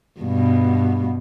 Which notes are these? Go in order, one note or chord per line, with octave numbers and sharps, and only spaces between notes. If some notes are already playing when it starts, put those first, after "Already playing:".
G2 B2